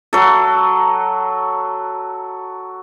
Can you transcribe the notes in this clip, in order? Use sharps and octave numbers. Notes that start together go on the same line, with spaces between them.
F#3 A4